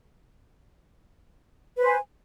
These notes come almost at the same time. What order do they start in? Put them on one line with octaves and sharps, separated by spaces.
B4 C5 G#5